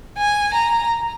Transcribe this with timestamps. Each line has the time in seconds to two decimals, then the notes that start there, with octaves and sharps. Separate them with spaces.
0.18 G#5
0.54 A#5